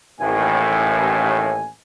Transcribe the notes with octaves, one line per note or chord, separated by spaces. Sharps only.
A1 D#2 A2 G#5